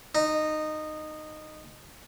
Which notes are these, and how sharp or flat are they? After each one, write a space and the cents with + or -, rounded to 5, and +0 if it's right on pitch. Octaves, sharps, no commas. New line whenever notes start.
D#4 -15